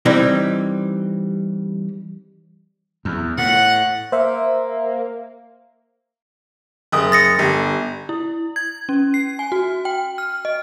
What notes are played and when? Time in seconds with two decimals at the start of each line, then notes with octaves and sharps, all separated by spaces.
0.05 E3 G3 C4 D#4
3.05 E2
3.38 A2 F#5
4.12 A#3 C5 E5
6.92 F#1 D#6
7.12 A6 A#6 C#7
7.39 G1
8.09 E4
8.56 G#6
8.89 C#4
9.14 C7
9.39 G#5
9.52 F#4
9.85 G5
10.18 F6
10.45 D#5